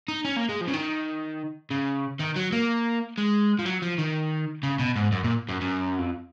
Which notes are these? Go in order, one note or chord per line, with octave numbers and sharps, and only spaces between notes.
D#4
C#4
A#3
G#3
F3
C#3
D#3
C#3
D#3
F#3
A#3
G#3
F3
F#3
F3
D#3
C#3
B2
G#2
F#2
A#2
F#2
F#2
F2